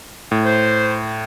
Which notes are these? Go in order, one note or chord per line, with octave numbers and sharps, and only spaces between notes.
A2
C5